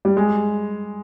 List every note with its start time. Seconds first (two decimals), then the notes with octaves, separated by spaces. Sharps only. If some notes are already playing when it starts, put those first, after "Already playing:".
0.05 G3
0.17 G#3